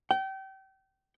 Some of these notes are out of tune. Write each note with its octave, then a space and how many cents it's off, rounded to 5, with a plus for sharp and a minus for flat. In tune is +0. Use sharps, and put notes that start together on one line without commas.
G5 -30